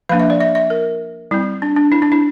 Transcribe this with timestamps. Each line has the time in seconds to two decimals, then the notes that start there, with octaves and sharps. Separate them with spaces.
0.09 F3 A#3 D4 F5
0.20 E5
0.30 D5
0.40 E5
0.55 E5
0.70 A#4
1.31 G3 C4 E4
1.62 D4
1.76 D4
1.92 E4
2.02 D4
2.12 E4